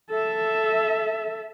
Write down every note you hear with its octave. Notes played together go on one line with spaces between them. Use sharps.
A4 E5